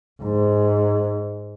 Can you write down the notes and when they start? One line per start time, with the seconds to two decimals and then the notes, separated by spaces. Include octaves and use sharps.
0.22 G#2